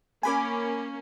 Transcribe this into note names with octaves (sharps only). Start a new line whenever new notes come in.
A#3 C#4 G#5 B5 D6